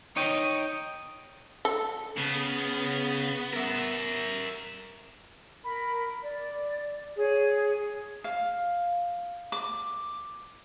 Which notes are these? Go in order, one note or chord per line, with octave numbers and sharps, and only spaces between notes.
D#4 C#5 D#5 G5
A4
C#3 B3
A#4 E5
A#4 B5
D5
G#4 C#5
F5
D6